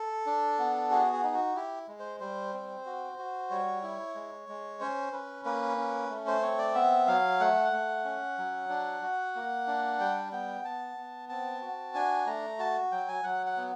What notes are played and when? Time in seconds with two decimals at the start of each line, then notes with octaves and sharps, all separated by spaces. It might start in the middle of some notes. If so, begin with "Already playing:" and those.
Already playing: A4
0.26 D4
0.59 B3
0.91 F#4 G#4
1.13 G#4
1.23 D#4
1.34 F#4
1.56 E4 G4
1.88 G#3
1.99 C5
2.20 G3 C5
2.53 C4
2.86 F#4
3.18 F#4
3.50 G3 C#5
3.83 E4
4.15 G#3
4.48 G#3
4.80 C#4 C5
5.13 C#4 B4
5.45 A#3 B4
5.77 C#4
6.10 A3
6.27 C5
6.42 C4 C#5
6.59 D5
6.75 B3 E5
7.07 F#3 F5
7.40 A3 F#5
7.73 A3
8.04 C#4
8.38 F#3
8.70 D4
9.02 F#4
9.35 A#3
9.67 D4
10.00 G3 G5
10.32 B3 G5
10.64 B3 A5
10.97 B3
11.29 C4 A5
11.61 F#4
11.95 D4 G#5
12.26 A3 A#5
12.59 F#4 A5
12.92 F#3 G5
13.08 G#5
13.24 F#3 F#5
13.46 F#5
13.57 B3